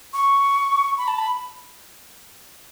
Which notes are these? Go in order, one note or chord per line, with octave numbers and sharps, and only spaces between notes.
C#6
B5
A5
B5